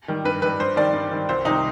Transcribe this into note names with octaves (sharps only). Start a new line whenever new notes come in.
D#3 G3
G2 B4
D#3 G3 B4
G2 C5
D#3 G3 D5
G2
D#3 G3
C2 C5
C3 D#3 G3 D#4